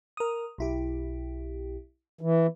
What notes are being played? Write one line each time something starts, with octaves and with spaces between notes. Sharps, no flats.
A#4 D#6
B1 E4 G4
E3